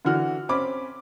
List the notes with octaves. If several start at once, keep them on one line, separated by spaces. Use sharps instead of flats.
D3 E3 F#4 F6
C4 C#4 B5 D6